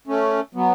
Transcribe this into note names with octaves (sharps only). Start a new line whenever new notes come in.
A3 C#4
F#3 B3